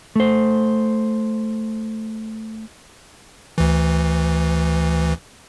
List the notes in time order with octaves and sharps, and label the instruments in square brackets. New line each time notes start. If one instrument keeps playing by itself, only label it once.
[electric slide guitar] A3 C5
[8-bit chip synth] D2 E3